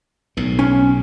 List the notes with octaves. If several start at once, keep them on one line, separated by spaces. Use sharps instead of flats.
B1 A2
C#4 G#5